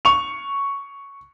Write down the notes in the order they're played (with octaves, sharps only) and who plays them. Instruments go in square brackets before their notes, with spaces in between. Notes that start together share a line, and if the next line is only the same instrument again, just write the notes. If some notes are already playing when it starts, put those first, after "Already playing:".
[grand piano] C#6 F7